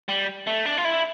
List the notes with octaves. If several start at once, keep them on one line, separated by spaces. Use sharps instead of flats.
G3
A3
D4
F4
E4